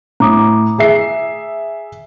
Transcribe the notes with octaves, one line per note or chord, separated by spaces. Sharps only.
A2 A#5 D6 D#6
G#4 E5 C7